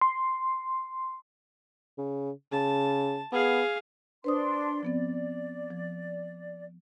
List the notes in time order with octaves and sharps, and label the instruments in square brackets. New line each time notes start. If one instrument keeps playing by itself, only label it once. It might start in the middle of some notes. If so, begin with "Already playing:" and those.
[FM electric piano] C6
[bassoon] C#3
[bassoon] C#3 [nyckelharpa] A5
[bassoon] B3 [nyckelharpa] G#4 F5
[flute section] D4 C6 [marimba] B4 C5 D#6
[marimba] F3 B3 C4 [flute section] D5
[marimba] F3